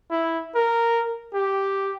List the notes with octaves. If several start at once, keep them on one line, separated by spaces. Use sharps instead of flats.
E4
A#4
G4